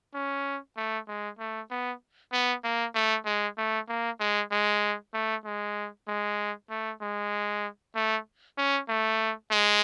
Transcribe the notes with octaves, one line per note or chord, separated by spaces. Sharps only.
C#4
A3
G#3
A3
B3
B3
A#3
A3
G#3
A3
A#3
G#3
G#3
A3
G#3
G#3
A3
G#3
A3
C#4
A3
G#3